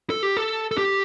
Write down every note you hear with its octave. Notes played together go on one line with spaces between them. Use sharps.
A4
G4
A4
A4
G4